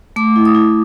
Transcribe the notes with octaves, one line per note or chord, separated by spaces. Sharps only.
A3 D6
E4
D#6
E4